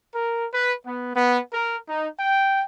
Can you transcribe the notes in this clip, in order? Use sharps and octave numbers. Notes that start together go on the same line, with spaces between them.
A#4
B4
B3
B3
A#4
D#4
G5